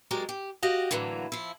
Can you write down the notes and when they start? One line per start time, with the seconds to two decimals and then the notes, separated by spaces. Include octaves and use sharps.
0.11 F#3 G#3 C4 G4 A#4 D5
0.29 G4
0.63 F#4 G4 D#5 F5 G5
0.91 A2 D3 E3 F#3 A#3
1.32 F3 E4